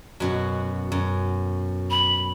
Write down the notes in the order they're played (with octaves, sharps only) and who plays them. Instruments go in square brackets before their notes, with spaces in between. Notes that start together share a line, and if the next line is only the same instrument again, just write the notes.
[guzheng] F#2 B2 F#4
F#2
[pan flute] B5